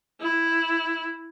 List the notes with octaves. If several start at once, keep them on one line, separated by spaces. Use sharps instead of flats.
E4